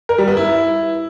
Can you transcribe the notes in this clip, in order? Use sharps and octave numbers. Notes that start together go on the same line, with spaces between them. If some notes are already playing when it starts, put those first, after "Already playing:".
A#4
G3
B3
E4